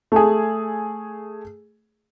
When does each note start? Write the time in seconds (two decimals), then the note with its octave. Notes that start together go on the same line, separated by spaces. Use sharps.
0.12 A3 G#4